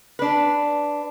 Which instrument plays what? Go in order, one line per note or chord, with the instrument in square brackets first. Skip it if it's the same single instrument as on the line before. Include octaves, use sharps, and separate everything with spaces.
[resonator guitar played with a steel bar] D4 B4